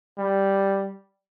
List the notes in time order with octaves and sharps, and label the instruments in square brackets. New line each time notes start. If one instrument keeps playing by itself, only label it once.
[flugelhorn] G3